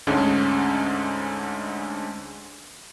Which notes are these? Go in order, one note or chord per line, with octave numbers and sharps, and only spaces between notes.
D2 G#2 D3 G#3 C#4 D4